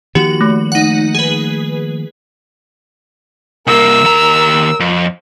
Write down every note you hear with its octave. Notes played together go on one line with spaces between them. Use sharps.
D#3 F3 A#3 F#4 G4
A3
D#4 F#5
G#4 B4
C2 A#3 A#4 E6
D#2 A#5
F2